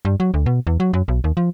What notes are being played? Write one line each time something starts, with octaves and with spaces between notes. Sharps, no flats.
G2
F#3
D2
B2
E2
F#3
F#2
B1
D#2
F3